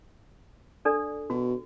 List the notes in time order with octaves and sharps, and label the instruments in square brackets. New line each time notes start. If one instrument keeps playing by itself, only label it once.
[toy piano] D4 A4 D5
[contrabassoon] B2 [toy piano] F#4